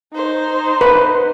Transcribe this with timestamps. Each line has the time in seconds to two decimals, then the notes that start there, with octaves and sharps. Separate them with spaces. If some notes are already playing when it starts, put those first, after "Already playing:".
0.13 D#4 C5
0.81 B4